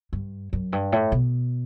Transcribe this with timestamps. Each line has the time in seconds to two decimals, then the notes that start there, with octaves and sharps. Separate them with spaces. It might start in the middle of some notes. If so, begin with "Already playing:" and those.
0.13 G2
0.53 F#2
0.73 G2
0.92 A2
1.12 B2